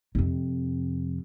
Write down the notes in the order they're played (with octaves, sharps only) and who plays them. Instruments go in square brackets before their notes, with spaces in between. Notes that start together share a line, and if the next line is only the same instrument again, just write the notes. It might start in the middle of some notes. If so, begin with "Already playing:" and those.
[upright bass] F2 C3